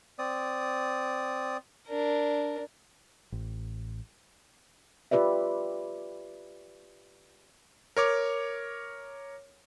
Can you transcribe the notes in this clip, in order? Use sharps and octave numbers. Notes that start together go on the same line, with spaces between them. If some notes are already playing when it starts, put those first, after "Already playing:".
C4 D5 D#6
D4 A#4
A1
F4 G4 B4 D5 E5
A#4 C#5 D6